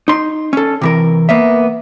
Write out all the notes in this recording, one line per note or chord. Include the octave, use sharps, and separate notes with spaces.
D#4 C6
C#4 A4
C3 E3 A#4
A#3 B3 E5